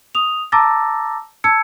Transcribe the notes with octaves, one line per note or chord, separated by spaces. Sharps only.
D#6 F7
A5 A#5 D6 E6 A6 A#6
A5 E6 G#6 C#7